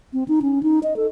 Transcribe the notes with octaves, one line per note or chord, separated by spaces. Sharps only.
C4
D#4
C#4
D#4
D#5
A4